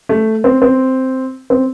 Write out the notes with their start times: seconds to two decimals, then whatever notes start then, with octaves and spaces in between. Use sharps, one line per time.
0.09 A3
0.44 C4
0.62 C4
1.50 C4